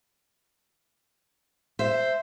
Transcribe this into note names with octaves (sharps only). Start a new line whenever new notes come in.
C5 E5